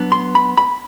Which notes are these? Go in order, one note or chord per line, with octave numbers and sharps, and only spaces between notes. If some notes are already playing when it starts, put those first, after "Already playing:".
Already playing: F#3 B3 D4
C6
B5
B5